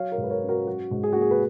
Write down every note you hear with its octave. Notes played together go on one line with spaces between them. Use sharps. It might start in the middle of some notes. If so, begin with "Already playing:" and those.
Already playing: F#3 C#5 F5
A#4 C#5
G#2
B4
A#4 C#5
C#4
F#4 A#4
F#3 F#4
G#2
G#4
A#3 F#4
G#4
B4